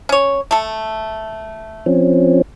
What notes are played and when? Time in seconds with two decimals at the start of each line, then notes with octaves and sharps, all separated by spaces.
0.09 C#4 C#5
0.51 A3 A4
1.86 F3 C4 C#4